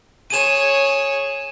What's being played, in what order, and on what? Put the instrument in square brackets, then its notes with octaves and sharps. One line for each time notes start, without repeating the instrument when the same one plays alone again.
[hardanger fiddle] G#4 C#5 [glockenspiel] D#7 E7